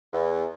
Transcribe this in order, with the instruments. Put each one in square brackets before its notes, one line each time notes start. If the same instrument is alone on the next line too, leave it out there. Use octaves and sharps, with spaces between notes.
[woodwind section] E2